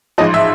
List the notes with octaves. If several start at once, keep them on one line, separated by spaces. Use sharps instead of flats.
A1 G#2 F3 D#5
E5